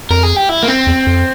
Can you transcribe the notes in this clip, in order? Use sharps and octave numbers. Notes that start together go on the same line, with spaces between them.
F2 A#4
G#4
G4
E4
A#3
C4
E2
F2